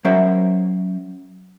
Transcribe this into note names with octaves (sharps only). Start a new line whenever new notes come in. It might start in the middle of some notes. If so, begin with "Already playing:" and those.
F#3 C#4 A#4 C5 E5 F#5